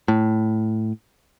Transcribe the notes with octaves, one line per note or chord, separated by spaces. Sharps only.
A2